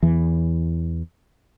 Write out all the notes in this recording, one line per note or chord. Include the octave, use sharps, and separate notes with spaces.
E2 E3